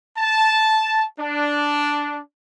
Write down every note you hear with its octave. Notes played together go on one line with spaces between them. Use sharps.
A5
D4